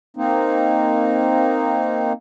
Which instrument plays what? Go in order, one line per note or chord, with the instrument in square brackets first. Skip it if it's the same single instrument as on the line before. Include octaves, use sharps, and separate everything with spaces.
[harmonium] A#3 C4 D#4